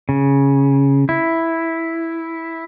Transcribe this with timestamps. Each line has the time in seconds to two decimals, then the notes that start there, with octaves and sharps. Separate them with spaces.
0.09 C#3
1.09 E4